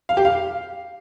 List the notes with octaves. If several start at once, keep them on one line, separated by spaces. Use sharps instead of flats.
F5
G4
F5